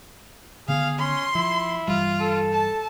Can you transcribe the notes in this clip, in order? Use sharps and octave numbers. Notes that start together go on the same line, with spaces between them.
D3 D#3 B3 G#4 F5
C#4 C6
F3 E4
G2 E3 G3 F4
A4
A5